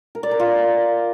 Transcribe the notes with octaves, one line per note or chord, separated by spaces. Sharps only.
A#4
D5
A#4
F4